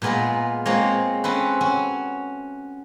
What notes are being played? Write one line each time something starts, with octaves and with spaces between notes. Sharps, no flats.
A#2 G#3 B3 F4 A#4
G#3 A#3 C4 F4 C#5
C4 C#4 A4 B4
C#4 F#4